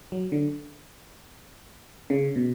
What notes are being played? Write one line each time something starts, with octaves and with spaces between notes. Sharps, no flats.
F#3
D3
C#3
B2